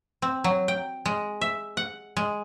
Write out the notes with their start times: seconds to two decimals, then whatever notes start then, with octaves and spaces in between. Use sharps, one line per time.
0.22 C4
0.44 F#3
0.68 G5
1.06 G#3
1.41 E5
1.77 F#5
2.17 G#3